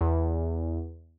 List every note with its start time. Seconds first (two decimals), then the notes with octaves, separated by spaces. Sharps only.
0.01 E2